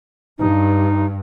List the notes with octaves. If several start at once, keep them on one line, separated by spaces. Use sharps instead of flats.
G2 D#4